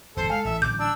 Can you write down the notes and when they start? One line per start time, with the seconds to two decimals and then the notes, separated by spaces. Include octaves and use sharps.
0.17 G1 E2 B2 A4 C5
0.30 G#3 F5 G#5
0.45 A1 E5
0.62 A1 D3 F#3 D6 G6
0.79 D4 E6